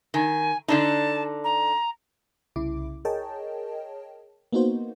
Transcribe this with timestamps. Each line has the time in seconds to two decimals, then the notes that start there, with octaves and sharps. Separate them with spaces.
0.14 D#3 G#5
0.68 D3 D4 D#4 A5
1.44 A#5
2.56 C2 C#3 E4 D6
3.05 G#4 A#4 C#5 D#5 G5 A5
4.52 A#3 B3 D#4 F#4 C5